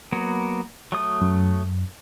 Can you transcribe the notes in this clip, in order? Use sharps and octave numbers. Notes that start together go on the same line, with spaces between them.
F#3 A#3 B3
F#3 A3 D#6
F#2